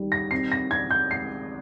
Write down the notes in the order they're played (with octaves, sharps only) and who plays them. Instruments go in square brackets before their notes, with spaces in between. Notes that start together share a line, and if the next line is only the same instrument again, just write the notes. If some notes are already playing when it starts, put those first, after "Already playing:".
Already playing: [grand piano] D#3 G3
[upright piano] A#6
[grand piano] C4 [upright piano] C7
[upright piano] A#6
[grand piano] C4 [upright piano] G#6
[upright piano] G6
[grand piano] G#3 [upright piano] C7